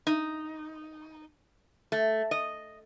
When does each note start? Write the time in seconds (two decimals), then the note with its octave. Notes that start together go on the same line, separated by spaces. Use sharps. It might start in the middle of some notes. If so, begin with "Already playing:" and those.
0.07 D#4
1.92 A3
2.31 D#5